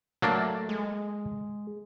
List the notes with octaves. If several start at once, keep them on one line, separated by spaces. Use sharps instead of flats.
F#3 A3 A#3 D4
G#3